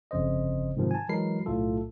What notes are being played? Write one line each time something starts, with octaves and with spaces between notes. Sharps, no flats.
G1 F2 C#3 C5 D#5
G#2 C3 D#3 F3
G#5 A5
E3 F#3 G#3 A#4 B5 C7
B1 A2 A3 F4 A4